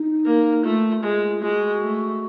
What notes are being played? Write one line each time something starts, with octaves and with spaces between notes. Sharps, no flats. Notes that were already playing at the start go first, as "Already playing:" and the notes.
Already playing: D#4
A#3
A3 F4
G#3
G#3 F#4
A3